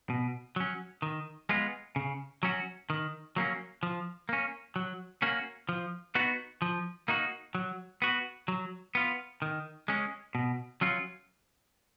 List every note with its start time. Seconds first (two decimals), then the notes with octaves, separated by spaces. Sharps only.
0.10 B2
0.56 F#3 C#4
1.02 D#3
1.49 G#3 B3 F4
1.96 C#3
2.43 F#3 C#4 F#4
2.90 D#3
3.36 F#3 A#3 C#4
3.83 F3
4.29 A#3 C#4
4.76 F#3
5.22 A#3 C#4 F#4
5.69 F3
6.15 B3 D#4 F#4
6.62 F3
7.08 A#3 D#4 F#4
7.55 F#3
8.02 B3 F#4
8.48 F#3
8.95 B3 F4
9.42 D#3
9.88 G#3 C#4
10.35 B2
10.81 F#3 C#4 F4